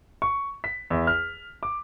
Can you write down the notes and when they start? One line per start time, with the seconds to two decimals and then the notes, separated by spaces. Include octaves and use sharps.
0.22 C#6
0.64 B6
0.90 E2
1.07 F6
1.63 D6